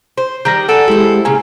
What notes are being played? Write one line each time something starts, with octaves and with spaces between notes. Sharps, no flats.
C5
D#3 G3 G6 A#6
A4 D5 F#5 G#5
G#3 E4 G4 C5
A#2 C#3 G#5